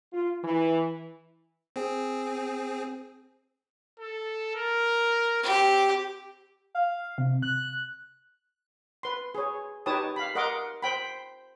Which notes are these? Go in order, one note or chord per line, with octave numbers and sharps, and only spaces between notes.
F4
E3
C4 G#4
A4
A#4
C4 G4
F5
C3
F#6
B4 C6
G#4 C#5
D#4 G4 B4 C#5 A5 D#6
F5 B5
A#4 D#5 F#5 C6 D6
C5 G5 B5